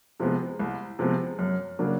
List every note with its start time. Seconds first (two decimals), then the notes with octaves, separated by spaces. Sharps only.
0.20 C3 F3 G#3 B3
0.59 C2
0.99 C3 F3 G#3 B3
1.39 F#2
1.79 C#3 F#3 A#3 D4